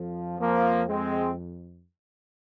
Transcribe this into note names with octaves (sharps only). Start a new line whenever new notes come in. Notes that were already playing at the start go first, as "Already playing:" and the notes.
Already playing: F2 F3
F3 A#3
G#3 C4